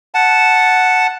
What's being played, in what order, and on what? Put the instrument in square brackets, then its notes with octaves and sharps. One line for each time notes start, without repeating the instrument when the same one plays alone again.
[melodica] F#5 A5